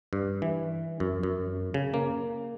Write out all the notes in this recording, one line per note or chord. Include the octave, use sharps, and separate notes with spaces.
G2
E3
F#2
F#2
C#3
A#3